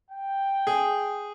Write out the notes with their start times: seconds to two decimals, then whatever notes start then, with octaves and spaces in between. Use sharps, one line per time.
0.11 G5
0.67 G#4